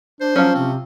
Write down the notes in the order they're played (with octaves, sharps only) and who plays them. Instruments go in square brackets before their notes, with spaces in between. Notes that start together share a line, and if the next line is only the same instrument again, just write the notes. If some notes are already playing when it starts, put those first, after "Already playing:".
[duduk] D4 [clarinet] C5
[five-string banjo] F3 C#4 [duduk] F#3
[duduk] C3 [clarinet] C4